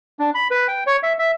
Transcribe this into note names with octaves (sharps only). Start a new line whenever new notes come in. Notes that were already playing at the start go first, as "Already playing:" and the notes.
D4
B5
B4
G5
C#5
E5
E5